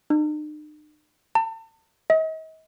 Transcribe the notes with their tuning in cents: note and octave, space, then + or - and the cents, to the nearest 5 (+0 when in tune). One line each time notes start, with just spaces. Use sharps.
D#4 -45
A5 +40
D#5 +40